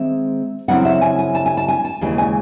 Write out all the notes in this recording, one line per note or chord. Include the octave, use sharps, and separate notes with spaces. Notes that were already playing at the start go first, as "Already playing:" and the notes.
Already playing: D#3 G#3 C4 E5
C#3 F#3 A3 C4 E4 F#5
E5
G#5
G#5
A5
G#5
A5
G#5
A5
D#2 C#3 E3 G#3 G#5
G#5